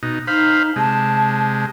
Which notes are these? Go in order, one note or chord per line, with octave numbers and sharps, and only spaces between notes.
B2 D#4
D#4 C5 F5 B5
C3 G#3 A5